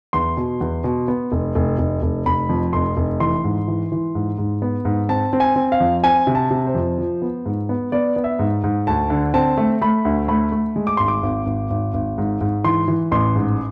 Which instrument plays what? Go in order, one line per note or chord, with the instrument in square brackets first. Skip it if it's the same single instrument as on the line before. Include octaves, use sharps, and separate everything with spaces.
[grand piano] E2 C6
B2
E2
B2
B3
F1
F1
F1
F1
F1 B5
F2
F1 C6
F1
E3 C6
G#2
E3
E3
G#2
G#2
B3
G#2
C4 A5
C4
G#5
C4
F5
F2
C4 G#5
C3
A5
C3
C5
F2
F3
B3
G#2
B3
B3 D5
B3
E5
G#2
G#2
D2 A5
D3
C4 A5
A3
A3 B5
D2
A3 B5
A3
G#3
D6
G#1 C6
D6
G#1
G#1
G#1
G#1
G#2
G#2
E3 C6
E3
A1 C6
G#2